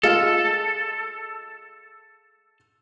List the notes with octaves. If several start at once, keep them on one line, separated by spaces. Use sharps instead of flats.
G#3 F4 A4